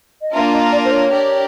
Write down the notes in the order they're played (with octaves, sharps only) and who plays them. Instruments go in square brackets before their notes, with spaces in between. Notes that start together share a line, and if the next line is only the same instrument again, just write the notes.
[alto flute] D#5
[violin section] A#3 D4 F4 A#4 [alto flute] E5
[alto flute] D#5
D5
C5
C#5
[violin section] D4 G4 A#4 D5